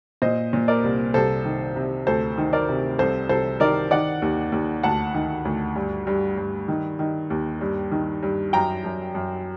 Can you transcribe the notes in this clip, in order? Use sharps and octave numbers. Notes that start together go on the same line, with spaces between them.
A#2 C5 D#5
A#2
A#4 D5
C2
C2 A4 C5
D#3
C3
D2 A4 C5
D#3
A#4 D5
C3
C2 A4 C5
C2 A4 C5
D#3 A#4 D5
D#3 D5 F#5
D#2
D#2
D2 F#5 A5
D#3
D2
G2
G2
G2
D#3
D#3
D#2
G2
D#3
G2
F#2 G5 A#5
F#2
F#2